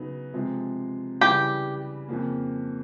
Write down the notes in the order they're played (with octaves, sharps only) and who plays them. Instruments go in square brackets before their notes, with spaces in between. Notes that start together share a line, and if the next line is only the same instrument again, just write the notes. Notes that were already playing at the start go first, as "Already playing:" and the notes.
Already playing: [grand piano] C#3 F#3 B3 D#4
C3 F3 G#3
[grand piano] C#3 E3 G3 [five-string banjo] G4
[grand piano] F2 C#3 F3 A#3